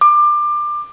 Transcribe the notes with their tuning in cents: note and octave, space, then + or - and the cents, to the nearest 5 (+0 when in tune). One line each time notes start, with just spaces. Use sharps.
D6 +25